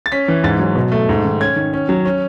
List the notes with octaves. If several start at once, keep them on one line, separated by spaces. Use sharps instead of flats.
A6
C#4 B6
E3
G#2 A6
F#3
B2
A3
G#2
D#3
C#4 G#6
D#3
C#4
F#3
C#4